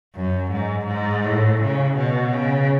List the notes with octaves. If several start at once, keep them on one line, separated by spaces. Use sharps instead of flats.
F#2
G#2
G#2
A2
C#3
B2
C#3